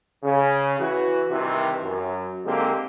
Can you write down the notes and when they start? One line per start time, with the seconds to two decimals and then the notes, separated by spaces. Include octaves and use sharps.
0.23 C#3
0.80 E3 F#4
1.30 G2 C3 D#3 E3
1.82 F#2
2.45 D3 G#3 A#3 C4 D#4 G4